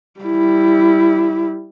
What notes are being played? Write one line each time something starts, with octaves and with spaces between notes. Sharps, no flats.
G3 E4